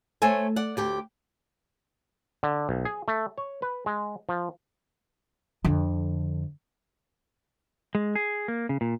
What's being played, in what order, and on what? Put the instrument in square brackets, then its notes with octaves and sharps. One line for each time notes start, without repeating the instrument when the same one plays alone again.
[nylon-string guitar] A3 C5 C#5 E5 G#5
D5 F#5
D2 G4 G5
[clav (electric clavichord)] D3
B1
G#4
A3
C#5
B4
G#3
F3
[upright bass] F2 D3
[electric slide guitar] G#3
G#4
A#3
C#3
A#2